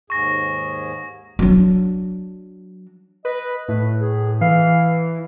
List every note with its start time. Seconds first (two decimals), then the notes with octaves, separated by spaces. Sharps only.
0.10 D#2 G#2 G#4 C#6 A#6
1.39 F#3 D4
3.25 B4 D#5
3.68 A2 B4
3.99 G#4
4.41 E3 F5